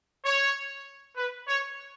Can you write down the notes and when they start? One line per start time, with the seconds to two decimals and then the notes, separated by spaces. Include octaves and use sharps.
0.25 C#5
1.17 B4
1.48 C#5